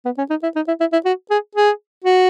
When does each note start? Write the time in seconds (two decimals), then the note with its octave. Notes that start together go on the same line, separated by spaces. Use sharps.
0.05 B3
0.18 C#4
0.30 D#4
0.43 E4
0.56 D#4
0.67 E4
0.80 E4
0.93 E4
1.05 F#4
1.30 G#4
1.55 G#4
2.04 F#4